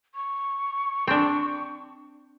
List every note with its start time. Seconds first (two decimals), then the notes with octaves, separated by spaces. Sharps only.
0.15 C#6
1.07 C4 D4